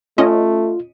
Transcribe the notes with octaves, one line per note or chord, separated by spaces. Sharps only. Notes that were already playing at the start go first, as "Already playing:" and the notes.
A3 C#4 F4 D#5